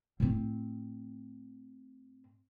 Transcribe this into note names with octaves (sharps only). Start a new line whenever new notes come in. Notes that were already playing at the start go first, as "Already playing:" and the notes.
A2 C4